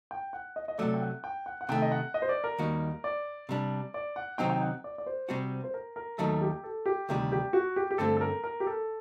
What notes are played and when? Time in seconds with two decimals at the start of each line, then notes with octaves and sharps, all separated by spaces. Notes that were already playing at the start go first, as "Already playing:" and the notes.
0.11 G5
0.33 F#5
0.56 D#5
0.68 D#5
0.78 C3 D#3 F#3 A3 D5
0.94 G5
1.01 F#5
1.24 G5
1.46 F#5
1.61 F#5
1.69 C3 D#3 A3 G5
1.82 D#5
1.92 F#5
2.14 D#5
2.22 C5
2.29 D5
2.44 A#4
2.58 D#2 D#3 G3 A#3 F#4
3.04 D5
3.49 C3 G3 D4
3.94 D5
4.16 F#5
4.38 C3 D#3 F#3 C4 D#4 G5
4.50 G5
4.61 F#5
4.84 D5
4.98 D5
5.06 C5
5.29 C3 G3 C4 F#4
5.64 C5
5.74 A#4
5.96 A#4
6.18 D#2 D#3 F#3 A3 A4
6.41 G4
6.64 A4
6.86 G4
7.09 D2 C3 D#3 G3 G4
7.32 G4
7.53 F#4
7.76 G4
7.91 G4
7.98 G2 D3 A3 C4 A4
8.17 A4
8.21 A#4
8.44 A#4
8.60 G4
8.67 A4